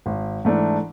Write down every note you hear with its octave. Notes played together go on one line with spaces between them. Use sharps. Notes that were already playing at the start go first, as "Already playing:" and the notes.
G#1
G#2 E3 A3 D4